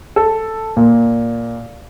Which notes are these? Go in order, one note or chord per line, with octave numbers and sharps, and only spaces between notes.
A4
A#2